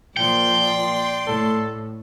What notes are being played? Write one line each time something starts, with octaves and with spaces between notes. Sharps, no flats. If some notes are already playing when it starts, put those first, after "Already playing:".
A#2 F3 D5 G5 C6
A2 A4